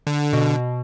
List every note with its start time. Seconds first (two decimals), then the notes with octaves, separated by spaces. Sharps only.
0.07 D3
0.33 B2